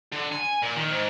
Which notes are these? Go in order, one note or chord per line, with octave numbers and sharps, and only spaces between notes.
D3
G#5
A#2
D#3
G#2